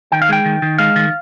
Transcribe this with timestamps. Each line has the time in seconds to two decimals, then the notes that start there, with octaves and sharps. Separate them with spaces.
0.12 D#3 G5
0.22 F5
0.29 G#3 G5
0.45 D#3
0.62 D#3
0.78 G#3 F5
0.96 D#3